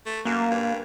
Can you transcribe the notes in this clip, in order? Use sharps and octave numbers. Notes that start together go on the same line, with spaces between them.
A3
F#2 A#3
G2